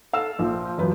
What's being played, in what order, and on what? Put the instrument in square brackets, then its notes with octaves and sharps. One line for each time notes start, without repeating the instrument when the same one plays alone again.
[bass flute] A4 [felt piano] F5 E6 E7
[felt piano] A#1 [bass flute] F3
[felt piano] E1 F#2 B4